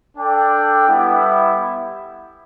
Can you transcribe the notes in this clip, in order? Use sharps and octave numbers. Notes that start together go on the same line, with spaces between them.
D4 A4 D5 G5
G3 B3 E4